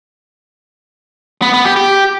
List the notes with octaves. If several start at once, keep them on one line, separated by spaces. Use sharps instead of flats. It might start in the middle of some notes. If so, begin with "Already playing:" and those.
B3
B3
G4
G4